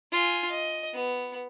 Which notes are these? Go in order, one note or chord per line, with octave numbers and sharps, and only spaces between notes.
F4 G#5
D#5
B3